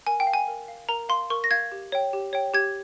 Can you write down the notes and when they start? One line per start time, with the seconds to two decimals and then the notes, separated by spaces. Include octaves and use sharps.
0.07 A#4 G#5
0.20 G5
0.27 F5
0.34 G#5
0.48 A#4
0.68 F5
0.89 A#4 A#5
1.09 F5 C6
1.30 A#4 C#6
1.44 A#6
1.51 F5 G#6
1.72 G4
1.92 C#5 G5
2.13 G4
2.33 C#5 G5
2.54 G4 G#6